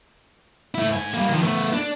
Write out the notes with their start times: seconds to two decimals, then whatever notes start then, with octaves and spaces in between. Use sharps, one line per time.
0.75 A3 E4
0.91 G#2 G#5
1.14 G3 A#3
1.29 D#3 F3
1.42 A3 B3
1.73 D4